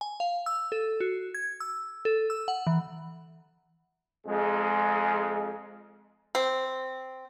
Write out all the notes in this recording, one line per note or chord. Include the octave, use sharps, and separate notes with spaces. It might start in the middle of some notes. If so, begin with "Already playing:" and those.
G#5
F5
E6
A4
F#4
G#6
E6
A4
E6
F#5
E3
F2 G#3
C4